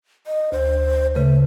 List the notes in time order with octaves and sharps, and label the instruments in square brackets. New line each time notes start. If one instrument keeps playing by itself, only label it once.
[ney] D#5
[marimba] D2 [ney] C5
[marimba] C#3 B4 [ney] A3